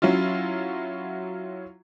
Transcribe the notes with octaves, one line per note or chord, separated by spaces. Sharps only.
F#3 C#4 E4 F4